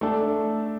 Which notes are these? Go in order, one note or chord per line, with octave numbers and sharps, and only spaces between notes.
A3 D4 A4